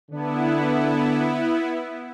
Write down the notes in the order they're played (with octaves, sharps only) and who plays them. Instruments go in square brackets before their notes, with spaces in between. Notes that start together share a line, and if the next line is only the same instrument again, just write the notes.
[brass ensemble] D3 D4 [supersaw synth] B3 E4